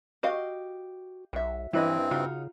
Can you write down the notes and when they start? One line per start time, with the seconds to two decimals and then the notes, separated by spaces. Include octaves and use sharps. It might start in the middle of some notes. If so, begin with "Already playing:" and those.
0.23 F#4 G4 D#5 F5
1.33 B1 F#4 E5
1.73 G2 E3 F3 C4 C#4 E4 B4 D#5
2.11 C#3 D#4 F4 F#4